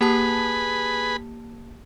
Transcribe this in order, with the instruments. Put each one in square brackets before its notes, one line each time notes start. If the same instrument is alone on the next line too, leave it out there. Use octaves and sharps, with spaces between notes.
[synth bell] A#3 G4 A5 [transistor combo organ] G#4 B4 B5